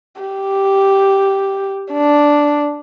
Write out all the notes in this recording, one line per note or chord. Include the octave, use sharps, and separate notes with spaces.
G4
D4